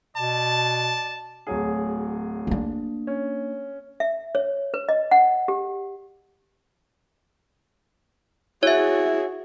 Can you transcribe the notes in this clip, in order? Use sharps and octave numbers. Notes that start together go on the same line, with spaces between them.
B2 D5 A5
D1 F#3 G#4
A#3 D4
C#4
E5
C#5
B4
D#5
F#5
G4
E4 F#4 G#4 C#5 E5